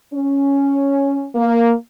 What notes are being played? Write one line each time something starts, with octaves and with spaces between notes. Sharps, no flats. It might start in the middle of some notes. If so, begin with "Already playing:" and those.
C#4
A#3